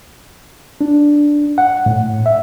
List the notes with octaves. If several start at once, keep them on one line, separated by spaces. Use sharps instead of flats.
D4
F#5
A2
E5